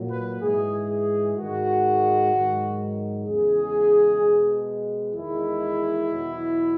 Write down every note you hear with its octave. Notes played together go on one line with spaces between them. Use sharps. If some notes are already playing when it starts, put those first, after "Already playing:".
Already playing: A#2 F#3
B4
G#2 E3 G#3 G#4
G#4
G#2 D#3 G#3 F#4
G#2 D#3 F#3
E2 C#3 G#3 G#4
B2 G#3
E2 D#3 G#3 E4
E2 B2 F#3